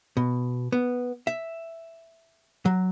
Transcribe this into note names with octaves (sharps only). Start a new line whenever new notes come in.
B2
B3
E5
F#3